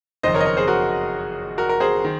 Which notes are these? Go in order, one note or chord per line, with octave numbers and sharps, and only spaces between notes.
F#1 F2 D#3 C5 D#5
A#4 C#5
D#5
A#4 C#5
G#4 C5
F#4 A#4
F#4 A#4
A#4
G#4 C5
D#3